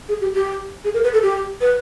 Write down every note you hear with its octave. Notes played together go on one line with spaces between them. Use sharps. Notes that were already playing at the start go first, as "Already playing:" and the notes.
G#4
G4
G4
G#4
A#4
B4
A4
G4
B4